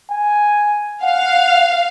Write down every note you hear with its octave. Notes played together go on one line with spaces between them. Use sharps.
G#5
F5 F#5